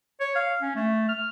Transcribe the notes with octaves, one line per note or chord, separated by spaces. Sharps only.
C#5
F5
C#4
A3
F6